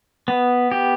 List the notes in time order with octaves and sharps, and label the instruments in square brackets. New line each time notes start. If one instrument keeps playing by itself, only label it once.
[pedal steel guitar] B3
G4